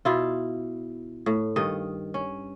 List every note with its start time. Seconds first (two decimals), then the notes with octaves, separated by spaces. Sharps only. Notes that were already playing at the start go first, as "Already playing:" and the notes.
0.05 B2 E4 F4
1.26 A2
1.56 G2 D#3 D#5
2.14 C#4